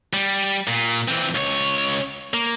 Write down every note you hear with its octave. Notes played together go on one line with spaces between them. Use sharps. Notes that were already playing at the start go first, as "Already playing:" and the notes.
G3
A#2
E3 C4
C#2 C#5
A#3